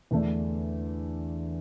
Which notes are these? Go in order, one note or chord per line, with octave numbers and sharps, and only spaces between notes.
E2 D3 A3 D4